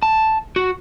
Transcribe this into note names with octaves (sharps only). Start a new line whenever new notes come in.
A5
F#4